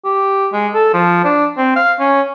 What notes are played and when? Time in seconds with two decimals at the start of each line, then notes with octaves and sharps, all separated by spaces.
0.05 G4
0.53 G#3
0.74 A4
0.94 F3
1.24 D4
1.58 C4
1.76 F5
2.00 C#4